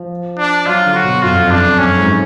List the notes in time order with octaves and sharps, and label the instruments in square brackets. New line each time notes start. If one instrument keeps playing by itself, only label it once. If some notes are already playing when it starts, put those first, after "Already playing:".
Already playing: [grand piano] F3
[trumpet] D4
[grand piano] F#3 [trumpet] F4
[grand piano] D3
[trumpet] F#4
[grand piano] B2
[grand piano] F#2 [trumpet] F4
[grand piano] F2
[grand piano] F2 [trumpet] D4
[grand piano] F#2 [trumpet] C#4
[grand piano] G#2